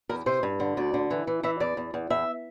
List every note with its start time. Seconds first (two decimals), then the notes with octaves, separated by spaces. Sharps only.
0.09 E2 A#4
0.26 C3 C5
0.43 G2
0.60 D3
0.77 D2 D5
0.94 D3
1.11 E3
1.27 E3
1.43 E3 E5
1.60 E2 D5
1.77 E2
1.94 E2
2.10 E2 E5